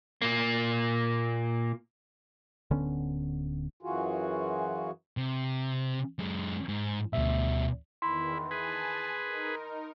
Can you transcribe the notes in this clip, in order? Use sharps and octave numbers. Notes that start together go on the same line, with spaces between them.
A#2 A#3
D1 D3 B3 C#4
F#2 E3 F4 F#4 G#4
C3
F#2 G#3
G#2
D2 B2 G3 E5
E2 D#3 E3 E4 B5 C6
G#4 B4 G#5 A5
D#4 A#4